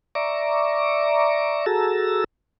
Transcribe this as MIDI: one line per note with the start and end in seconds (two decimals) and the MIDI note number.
0.15 1.66 74
0.15 1.66 76
0.15 1.66 82
0.15 1.66 85
0.15 1.66 86
1.66 2.24 66
1.66 2.24 68
1.66 2.24 69
1.66 2.24 81
1.66 2.24 82
1.66 2.24 88